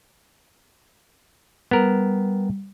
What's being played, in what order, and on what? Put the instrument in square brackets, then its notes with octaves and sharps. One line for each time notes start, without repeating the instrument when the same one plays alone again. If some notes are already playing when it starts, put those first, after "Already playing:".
[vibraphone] G3 [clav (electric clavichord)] B3 A#4